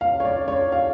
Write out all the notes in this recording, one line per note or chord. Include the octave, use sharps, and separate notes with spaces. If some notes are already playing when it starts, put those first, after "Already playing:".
F5
C#5
D5
C#5
F5